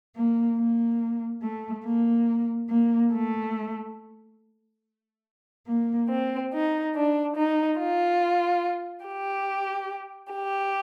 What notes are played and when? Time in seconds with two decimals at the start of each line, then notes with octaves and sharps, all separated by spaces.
0.15 A#3
0.58 A#3
1.42 A3
1.85 A#3
2.70 A#3
3.12 A3
5.68 A#3
6.10 C4
6.53 D#4
6.96 D4
7.37 D#4
7.80 F4
9.07 G4
10.35 G4